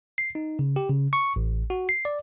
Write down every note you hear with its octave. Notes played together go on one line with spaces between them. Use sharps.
C7
D#4
C#3
G4
C#3
C#6
A1
F#4
C7
D5